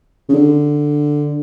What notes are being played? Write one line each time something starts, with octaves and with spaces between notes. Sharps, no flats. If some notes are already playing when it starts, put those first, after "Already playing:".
C#3
D3